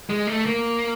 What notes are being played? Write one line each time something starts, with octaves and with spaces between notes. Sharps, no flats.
G#3
A3
A#3